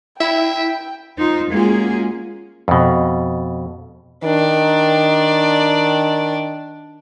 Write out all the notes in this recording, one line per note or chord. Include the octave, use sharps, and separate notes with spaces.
E4 E5 G5
D#4 F4 C5
G#3 A#3 C#4 F4 F#4 G#4
F2 B2
D#3 D4 D5